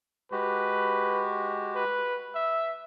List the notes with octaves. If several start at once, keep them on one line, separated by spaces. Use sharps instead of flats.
G#3 F#4 G4 B4
B4
E5